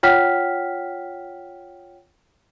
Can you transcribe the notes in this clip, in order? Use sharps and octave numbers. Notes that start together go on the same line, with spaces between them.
F4 C#5 F#5 G5 F6 B6